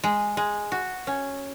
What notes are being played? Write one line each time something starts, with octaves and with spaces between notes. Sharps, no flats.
G#3
G#3
F#4
C#4